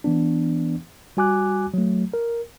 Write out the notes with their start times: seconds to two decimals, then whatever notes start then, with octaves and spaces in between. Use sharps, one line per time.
0.04 E3 B3 D4
1.17 G3 F#4 G#5 D6 F#6
1.74 F#3 A3
2.14 A#4